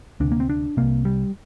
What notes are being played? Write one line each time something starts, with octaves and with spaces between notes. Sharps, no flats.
D2 C3 D4
A#3
C4
D4
C2 C3 A#3
G3